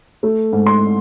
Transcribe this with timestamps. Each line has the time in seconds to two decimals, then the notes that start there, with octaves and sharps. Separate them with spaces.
0.23 A3
0.52 G#2
0.66 C6